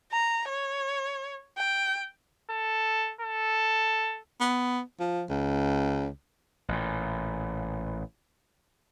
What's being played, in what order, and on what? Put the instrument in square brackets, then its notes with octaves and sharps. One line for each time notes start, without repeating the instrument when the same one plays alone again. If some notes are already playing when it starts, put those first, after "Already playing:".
[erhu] A#5
C#5
G5
[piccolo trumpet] A4
A4
[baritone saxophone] B3
F3
C#2
[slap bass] A1 A#2